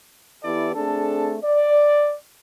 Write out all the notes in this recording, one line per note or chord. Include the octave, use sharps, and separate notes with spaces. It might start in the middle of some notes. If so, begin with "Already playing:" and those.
E3 B3 E4 G4 A4 D5
A3 C4 D4 G#4 A4
D5